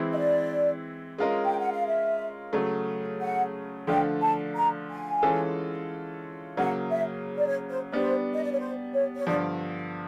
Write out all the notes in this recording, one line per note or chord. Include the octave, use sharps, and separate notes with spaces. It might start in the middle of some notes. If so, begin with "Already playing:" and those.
Already playing: E3 G#3 C4 E4
D#5
D5
G#3 C#4 F4 A#4 D#5
G5
F#5
F5
E5
C#3 F#3 A3
F#5
D3 F3 A3 D4 F4 G5
A5
A#5
G#5
E3 G#3 C#4 F4 A4
C#3 F#3 A#3 F#5
E5
D5
C#5
C5
G3 B3 D4 C5
D#5
D5
C#5
C5
C#5
C#5
G2 D3 F3 D5